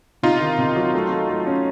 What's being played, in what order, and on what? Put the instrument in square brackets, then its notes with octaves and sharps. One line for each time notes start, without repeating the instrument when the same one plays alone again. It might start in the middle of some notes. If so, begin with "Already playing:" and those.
[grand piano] C3 [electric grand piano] D#4 F4
[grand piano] D#3
C3
F#3
A3
A3
A3
C#4